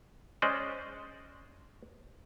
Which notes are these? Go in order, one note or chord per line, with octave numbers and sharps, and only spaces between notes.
G#3 C#4 C5 D5 D#5